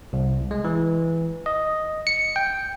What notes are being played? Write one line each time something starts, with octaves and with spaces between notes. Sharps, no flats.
C2
G#3
E3
D#5
C#7
G5